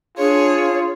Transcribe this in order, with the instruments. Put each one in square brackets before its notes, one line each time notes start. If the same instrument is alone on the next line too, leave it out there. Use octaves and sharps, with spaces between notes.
[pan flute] D4 [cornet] F4 [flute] G#4 [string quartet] C#5